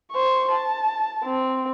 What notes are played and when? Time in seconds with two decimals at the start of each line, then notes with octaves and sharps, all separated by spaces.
0.12 C5 C#6
0.52 A5
1.25 C4